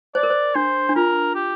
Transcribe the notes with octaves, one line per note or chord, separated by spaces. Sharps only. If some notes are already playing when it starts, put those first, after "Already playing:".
C5 D5
A#4
C5
D4 C5
D4
F4 A#4
G4